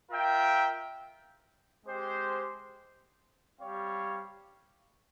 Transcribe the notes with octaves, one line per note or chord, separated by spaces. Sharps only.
F4 A#4 E5 G5
G#3 C4 G4 C5
G3 C4 G4 C#5 F5